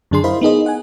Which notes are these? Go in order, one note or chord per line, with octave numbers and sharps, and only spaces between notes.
F#2 D3 D4 G#4 C6
E4 A#4 C5 D#5 F5 B5
B3 D#4 G#4 D#5
F#5 G#5